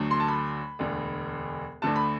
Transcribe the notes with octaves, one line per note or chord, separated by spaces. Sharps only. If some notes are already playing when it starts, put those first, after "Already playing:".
Already playing: D2 D3 F#3 A3
C6
A5
B5
E1 D2 D3
D2 D3 A3 A5
B5